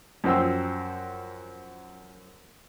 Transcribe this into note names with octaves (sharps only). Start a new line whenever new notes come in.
F#2 F3 C5 G5 E6